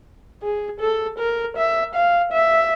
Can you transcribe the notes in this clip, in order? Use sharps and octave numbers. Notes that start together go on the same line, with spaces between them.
G#4
A4
A#4
E5
F5
E5